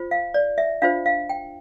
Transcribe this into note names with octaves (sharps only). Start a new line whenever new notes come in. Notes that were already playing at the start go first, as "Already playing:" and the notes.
Already playing: F4 C5
F5
D5
E5
D4 F4 C5 F5
F5
G5